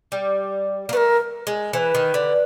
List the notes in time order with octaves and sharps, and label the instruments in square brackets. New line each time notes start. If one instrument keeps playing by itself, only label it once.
[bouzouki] G3
A#3
[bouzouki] A3 [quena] B4
[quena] A#4
[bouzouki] G#3
[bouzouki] E3 [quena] C5
[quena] B4
[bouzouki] D#3
D3